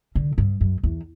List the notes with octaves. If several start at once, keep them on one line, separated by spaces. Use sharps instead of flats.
D3
G2
F#2
E2